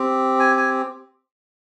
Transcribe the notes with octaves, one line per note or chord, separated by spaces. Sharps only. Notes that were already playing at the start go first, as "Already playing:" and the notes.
Already playing: C4 G4
G#5
G#5